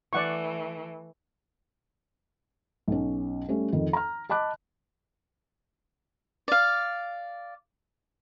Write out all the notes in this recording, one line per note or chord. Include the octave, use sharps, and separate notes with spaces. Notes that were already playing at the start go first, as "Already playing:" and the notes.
E3 A3 D5 F#5 C#6
B1 C#4
G3 A3 C#4
F2 D#3
A#5 F6
D#5 A5 B5 D6 F#6
D5 F5